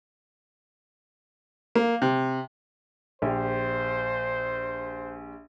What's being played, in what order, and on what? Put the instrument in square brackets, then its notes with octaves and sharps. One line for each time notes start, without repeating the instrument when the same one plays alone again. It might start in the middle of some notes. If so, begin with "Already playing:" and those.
[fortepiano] A#3
C3
[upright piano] A#1 G4 [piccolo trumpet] C5